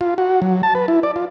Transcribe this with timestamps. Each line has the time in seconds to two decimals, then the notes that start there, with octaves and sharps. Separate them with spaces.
0.01 F4
0.18 F#4
0.42 F#3
0.63 A5
0.75 B4
0.88 E4
1.03 D5
1.16 F4